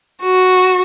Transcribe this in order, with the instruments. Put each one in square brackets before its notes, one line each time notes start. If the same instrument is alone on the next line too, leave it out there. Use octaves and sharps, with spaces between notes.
[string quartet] F#4